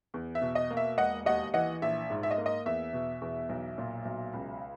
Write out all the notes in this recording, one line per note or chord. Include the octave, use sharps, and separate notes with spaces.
E2
E5
B2
D#5
A#3
E5
E1 D#5 F#5
D#2 D#5 F#5
E3 D#5 F#5
A#1 E5
G#2
E5
D#5
A#3
D#5
E2 E5
B2
E2
B1
A#2
B1
C#2